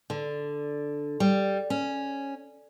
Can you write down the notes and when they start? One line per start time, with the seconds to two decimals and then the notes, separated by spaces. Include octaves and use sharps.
0.10 D3
1.20 G3
1.70 C#4